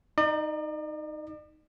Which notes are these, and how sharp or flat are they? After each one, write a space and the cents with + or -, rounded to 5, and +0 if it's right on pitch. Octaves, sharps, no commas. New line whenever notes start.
D#4 +0 D5 +45